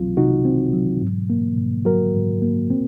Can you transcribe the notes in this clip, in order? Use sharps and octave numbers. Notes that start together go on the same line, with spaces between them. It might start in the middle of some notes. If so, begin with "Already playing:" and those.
Already playing: C2 F#3 C4 F4
C3 D#4 F#4
C4
F#3
G#2
A#3
G#2
F#3 F#4 A#4
G#2
A#3
C4